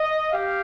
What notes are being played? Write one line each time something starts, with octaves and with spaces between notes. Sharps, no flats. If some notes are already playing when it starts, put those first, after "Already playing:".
Already playing: D#5
G4 F5